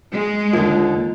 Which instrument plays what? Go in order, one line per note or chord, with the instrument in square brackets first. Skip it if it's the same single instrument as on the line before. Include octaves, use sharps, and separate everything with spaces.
[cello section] G#3
[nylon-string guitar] D#2 D3 [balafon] F4